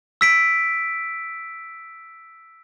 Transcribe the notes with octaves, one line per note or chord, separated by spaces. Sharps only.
E6 B6 D7